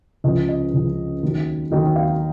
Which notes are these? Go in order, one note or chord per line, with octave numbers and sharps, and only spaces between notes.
C#2 C#3 F3 D#5
D#5
C#2 C#3 F3
D#2 D#3 F#3
D#2 D#3 F#3 D#5
F5